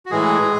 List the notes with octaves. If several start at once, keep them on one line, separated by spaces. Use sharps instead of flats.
F#4
A2 E3 G#3 G#4